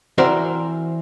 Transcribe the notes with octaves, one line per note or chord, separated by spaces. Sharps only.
E3 C4 F#4 A#4 C5 D5